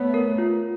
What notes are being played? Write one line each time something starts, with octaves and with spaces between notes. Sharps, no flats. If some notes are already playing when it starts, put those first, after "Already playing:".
Already playing: A3 B3 C#5
A#4
F4